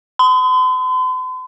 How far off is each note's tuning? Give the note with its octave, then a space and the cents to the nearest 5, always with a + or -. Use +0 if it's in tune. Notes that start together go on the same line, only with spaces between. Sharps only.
C6 -45